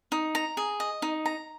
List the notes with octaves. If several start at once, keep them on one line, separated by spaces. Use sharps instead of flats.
D#4
A#5
G#4
D#5
D#4
A#5